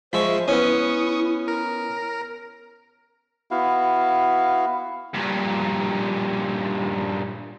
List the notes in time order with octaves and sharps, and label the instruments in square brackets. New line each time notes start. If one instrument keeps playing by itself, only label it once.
[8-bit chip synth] F3 G#3 E5 [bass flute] C5 [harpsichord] B5 C#6
[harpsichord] B3 C#4 [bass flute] E4 [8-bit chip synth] C#6 D#6
[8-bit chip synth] A#4
[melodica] B3 E4 F#4 F5
[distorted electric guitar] G2 A#2